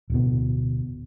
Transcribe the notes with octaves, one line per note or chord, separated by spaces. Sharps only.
D1 B2